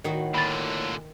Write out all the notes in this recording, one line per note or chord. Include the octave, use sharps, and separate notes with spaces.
A2 D#3 F#4 D#5
A#2 D3 B5 A6